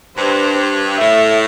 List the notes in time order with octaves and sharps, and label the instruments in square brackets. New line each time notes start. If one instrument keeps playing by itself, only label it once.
[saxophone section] G2 [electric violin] C5
[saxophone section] A2 [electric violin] E5